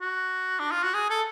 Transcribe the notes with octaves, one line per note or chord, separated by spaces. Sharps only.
F#4
D4
F4
F#4
G#4
A4